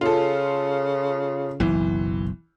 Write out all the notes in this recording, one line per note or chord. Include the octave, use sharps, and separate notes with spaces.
C#3 F4 A4
F#1 B1 F#2 E3